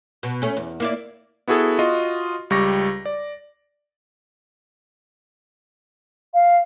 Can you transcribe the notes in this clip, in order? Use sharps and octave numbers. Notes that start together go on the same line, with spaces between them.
B2
A3 C#4
E2
A#3 E4 D5
B3 E4 F#4 G#4 A4
F4 F#4 D#5
C#2 G3 G4 C#6 A#6
D5
F5